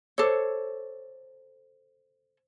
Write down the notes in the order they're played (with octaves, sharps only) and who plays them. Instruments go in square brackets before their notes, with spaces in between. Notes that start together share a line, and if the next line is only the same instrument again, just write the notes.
[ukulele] A4 C#5 [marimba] C5 D6 E6